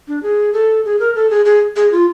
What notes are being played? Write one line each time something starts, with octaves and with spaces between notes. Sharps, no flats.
D4
G#4
A4
G#4
A#4
A4
G#4
G#4
G#4
F4